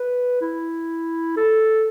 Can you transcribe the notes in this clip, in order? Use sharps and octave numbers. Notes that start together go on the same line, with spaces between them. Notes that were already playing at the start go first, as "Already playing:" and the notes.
Already playing: B4
E4
A4